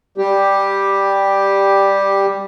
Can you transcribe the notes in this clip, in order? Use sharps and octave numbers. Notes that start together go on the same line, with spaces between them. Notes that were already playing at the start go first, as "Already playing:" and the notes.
G3 G4